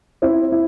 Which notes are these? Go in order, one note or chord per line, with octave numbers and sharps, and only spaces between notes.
C4 E4
E4